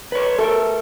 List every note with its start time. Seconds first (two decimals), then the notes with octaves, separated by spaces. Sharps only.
0.12 B4 C#5
0.38 A3 A4 A#4